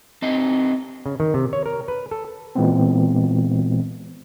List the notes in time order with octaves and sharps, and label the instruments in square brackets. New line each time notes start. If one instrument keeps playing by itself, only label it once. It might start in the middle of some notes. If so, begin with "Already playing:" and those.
[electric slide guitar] C4 D4 D#4 G4 D#5
[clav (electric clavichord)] C#3
D#3
C3
C#5
A#4
B4
A4
[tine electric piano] A#2 E3 G#3 B3 C4